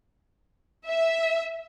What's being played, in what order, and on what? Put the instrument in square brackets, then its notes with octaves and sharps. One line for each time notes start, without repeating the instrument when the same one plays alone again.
[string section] E5